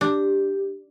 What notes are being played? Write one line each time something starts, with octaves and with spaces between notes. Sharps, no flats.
D4 G4